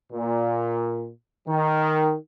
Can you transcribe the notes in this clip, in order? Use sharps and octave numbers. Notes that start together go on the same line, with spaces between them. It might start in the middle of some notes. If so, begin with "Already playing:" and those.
A#2
D#3